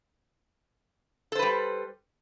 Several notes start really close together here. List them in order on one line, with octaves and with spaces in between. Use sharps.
A4 C5 B4 G3